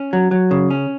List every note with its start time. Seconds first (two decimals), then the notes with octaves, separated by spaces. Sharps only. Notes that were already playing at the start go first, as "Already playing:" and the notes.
Already playing: C#4
0.13 F#3
0.31 F#3
0.51 C#3
0.70 C#4